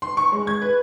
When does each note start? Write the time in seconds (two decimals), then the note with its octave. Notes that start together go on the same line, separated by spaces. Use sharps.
0.02 C6
0.17 C#6
0.32 G#3
0.47 G#6
0.62 B4